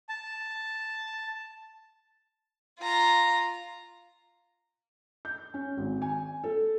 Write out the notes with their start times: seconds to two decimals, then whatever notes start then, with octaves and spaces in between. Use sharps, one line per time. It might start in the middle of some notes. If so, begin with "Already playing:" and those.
0.09 A5
2.80 F4 A#5
5.25 G6
5.54 C#4
5.77 G#1
6.02 G#5
6.44 A4